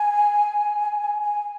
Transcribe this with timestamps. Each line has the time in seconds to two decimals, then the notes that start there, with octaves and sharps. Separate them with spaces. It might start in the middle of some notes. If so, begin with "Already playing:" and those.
Already playing: G#5
1.21 G#5